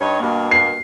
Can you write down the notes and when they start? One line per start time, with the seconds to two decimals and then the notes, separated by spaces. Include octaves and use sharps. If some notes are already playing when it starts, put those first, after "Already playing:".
0.01 G2 D#4 C#5
0.20 G2 B2 A#3
0.51 C7